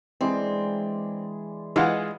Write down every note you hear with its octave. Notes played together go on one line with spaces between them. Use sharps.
E3 G#3 C4 D4
E3 G#3 F4 F#5